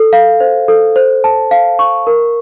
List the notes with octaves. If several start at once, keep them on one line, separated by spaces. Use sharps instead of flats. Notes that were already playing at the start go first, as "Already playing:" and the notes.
Already playing: A4
F5
C5
A4
C5
A5
F5
C#6
A#4